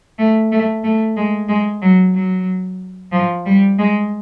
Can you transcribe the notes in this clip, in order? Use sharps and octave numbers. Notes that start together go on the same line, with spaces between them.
A3
A3
A3
G#3
G#3
F#3
F#3
F3
G3
G#3